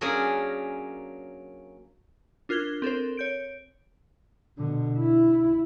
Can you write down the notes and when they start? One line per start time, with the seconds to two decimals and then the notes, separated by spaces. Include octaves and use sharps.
0.01 F#3 A#3 C#4 D4 G#4 A#4
2.49 D4 F4 A#4 F#6 G#6 G7
2.82 C4 A4 A#4 C5
3.17 C#5 G6 D7
4.58 B2 D3
4.98 E4